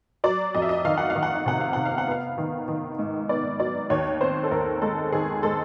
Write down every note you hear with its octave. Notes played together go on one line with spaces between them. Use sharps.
F#3 D5
F2 D#5
E5
D#5
D#3 F5
F#5
F5
D#3
F#5
F5
C3 F#5
F5
C3 F#5
F5
F#5
B3 F5
D#3
D#3
G#2
B3 D5
F#3 D5
D#2 C#5
C4 C5
A4
D#2 A#4
G#3 A4
D#3 G#4
G#3 A4